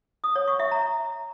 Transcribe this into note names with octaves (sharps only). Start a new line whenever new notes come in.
D#6
C#5
C#6
E5
A#5